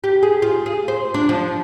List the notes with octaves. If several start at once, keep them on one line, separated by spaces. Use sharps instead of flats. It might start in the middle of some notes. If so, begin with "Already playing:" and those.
G4
G#4
F4
G#4
C5
D4
F3